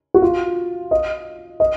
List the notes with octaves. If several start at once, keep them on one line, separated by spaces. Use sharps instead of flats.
F#4
F4
D#5
D#5